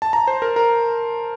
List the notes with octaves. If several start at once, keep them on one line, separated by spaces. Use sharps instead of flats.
A5
A#5
C5
A#4
A#4